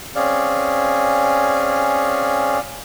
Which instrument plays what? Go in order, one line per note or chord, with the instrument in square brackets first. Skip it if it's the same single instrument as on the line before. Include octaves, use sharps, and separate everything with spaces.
[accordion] C4 C#4 G#4 [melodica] D5 F5